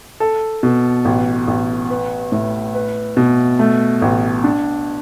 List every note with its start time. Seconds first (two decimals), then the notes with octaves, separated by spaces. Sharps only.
0.20 A4
0.63 B2
1.05 A1
1.47 A1
1.90 B4
2.32 A2
2.74 B4
3.17 B2
3.59 A3
4.02 A1
4.44 D4